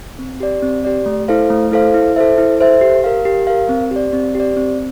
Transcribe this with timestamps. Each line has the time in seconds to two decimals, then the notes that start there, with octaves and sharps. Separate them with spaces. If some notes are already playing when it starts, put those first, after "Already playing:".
0.19 C4
0.40 G4 D5
0.62 C4
0.85 G4 D5
1.06 A3
1.28 E4 A4 C5 F5
1.50 A3
1.72 E4 A4 C5 F5
1.94 E4
2.16 A4 C5 E5
2.38 E4
2.60 A4 C5 E5
2.81 G4
3.04 A#4 F5
3.25 G4
3.47 A#4 F5
3.69 C4
3.91 G4 D5
4.13 C4
4.35 G4
4.40 D5
4.57 C4